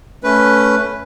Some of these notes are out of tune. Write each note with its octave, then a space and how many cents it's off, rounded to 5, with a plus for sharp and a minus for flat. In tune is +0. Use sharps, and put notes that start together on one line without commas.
A3 -5 C#4 +5 B4 +0